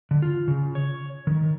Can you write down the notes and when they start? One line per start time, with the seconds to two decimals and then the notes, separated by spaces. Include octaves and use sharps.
0.11 D3
0.22 F4
0.48 C#3
0.75 C#5
1.27 D#3